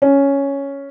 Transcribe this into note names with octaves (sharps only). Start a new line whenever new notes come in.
C#4